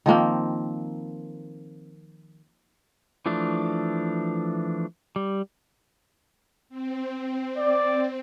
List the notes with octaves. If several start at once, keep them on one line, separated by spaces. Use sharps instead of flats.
D#3 F3 A#3 C4
E3 F3 A3 D4
G3
C4
D5